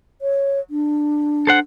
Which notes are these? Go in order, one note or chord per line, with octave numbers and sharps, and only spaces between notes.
C#5
D4
A4 C5 F#5